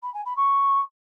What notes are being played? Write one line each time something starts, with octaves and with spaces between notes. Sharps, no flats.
B5
G#5
B5
C#6